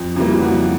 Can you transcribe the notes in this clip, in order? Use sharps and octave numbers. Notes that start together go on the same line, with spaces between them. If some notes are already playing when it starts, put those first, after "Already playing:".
Already playing: F2
C#3 E3 G3 A#3
F2 F#4